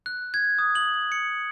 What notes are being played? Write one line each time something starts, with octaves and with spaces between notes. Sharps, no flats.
F#6
G#6
D#6
F#7
C#7